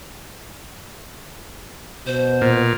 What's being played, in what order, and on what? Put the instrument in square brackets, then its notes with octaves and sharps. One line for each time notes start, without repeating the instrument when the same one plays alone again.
[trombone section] B2 [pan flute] C5
[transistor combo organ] A#2